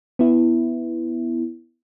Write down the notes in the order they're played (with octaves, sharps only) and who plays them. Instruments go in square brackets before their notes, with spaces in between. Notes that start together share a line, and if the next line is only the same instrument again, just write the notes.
[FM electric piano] B3 E4